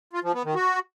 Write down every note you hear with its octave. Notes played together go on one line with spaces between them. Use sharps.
F4
F3
B3
D#3
F#4